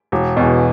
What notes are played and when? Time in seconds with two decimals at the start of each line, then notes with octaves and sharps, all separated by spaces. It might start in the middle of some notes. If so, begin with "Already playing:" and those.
0.12 E1
0.37 E2 B2